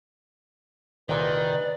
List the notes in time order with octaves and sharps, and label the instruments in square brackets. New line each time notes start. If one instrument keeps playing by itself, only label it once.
[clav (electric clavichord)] C2 A#2 G#4 [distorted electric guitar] D#3 [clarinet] B4 [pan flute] D5